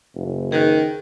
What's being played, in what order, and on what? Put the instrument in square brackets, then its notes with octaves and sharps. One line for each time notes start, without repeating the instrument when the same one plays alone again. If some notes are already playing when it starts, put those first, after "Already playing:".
[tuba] F#1
[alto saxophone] D#3 [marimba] G#4 F#6